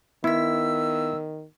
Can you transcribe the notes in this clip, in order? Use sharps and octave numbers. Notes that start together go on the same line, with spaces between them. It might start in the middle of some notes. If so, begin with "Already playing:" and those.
D#3 B3 E4 E6 B6